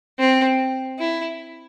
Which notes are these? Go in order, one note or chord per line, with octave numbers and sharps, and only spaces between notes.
C4
E4